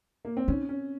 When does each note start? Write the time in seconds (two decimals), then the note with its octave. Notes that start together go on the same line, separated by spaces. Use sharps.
0.25 A#3
0.37 C4
0.48 C#4 D#4
0.69 C#4